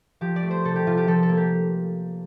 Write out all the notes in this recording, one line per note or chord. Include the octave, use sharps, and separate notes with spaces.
F3 G4
D5
A3
C5
C3 A4
G4
C3 F4
G4
F3 A4
A4
A#3
G4